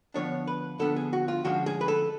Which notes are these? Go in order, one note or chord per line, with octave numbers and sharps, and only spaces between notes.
D3 F3 B3 D4 C#5
B4
D3 F3 B3 D4 A4
G#4
F#4
F4
D3 F3 G#3 C#4 F#4
G#4
B4
A4